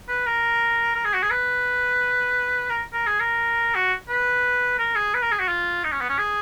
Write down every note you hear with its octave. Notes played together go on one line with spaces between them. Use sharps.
B4
A#4
A#4
G#4
F#4
G#4
B4
A#4
A#4
G#4
A#4
F#4
B4
A#4
G#4
B4
A#4
G#4
F#4
F4
D#4
C#4
B3
C#4
G#4